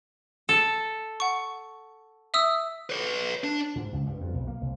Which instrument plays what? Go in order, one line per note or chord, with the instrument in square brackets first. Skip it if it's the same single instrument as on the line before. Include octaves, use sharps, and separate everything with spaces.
[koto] A4
[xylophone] F#5 C#6
E5 D#6 E6
[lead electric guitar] B4 C#5
D4
[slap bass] G#2
C#2
G2
F2
B1
A#3
C2